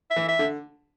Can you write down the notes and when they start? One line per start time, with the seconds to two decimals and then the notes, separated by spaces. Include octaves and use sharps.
0.11 E5
0.16 E3
0.28 E5
0.39 D3